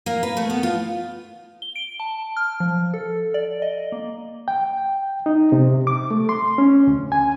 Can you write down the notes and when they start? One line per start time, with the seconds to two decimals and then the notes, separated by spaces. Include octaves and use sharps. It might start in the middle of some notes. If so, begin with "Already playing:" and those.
0.06 A#3
0.23 B4
0.37 A3
0.50 B3
0.63 F4
1.62 G7
1.76 D7
2.00 A5
2.37 F6
2.60 F3
2.94 A4
3.34 D5
3.62 D#5
3.92 A#3
4.48 G5
5.26 D#4
5.52 C3
5.87 D6
6.11 A3
6.29 C6
6.58 C#4
6.87 D2
7.12 G#5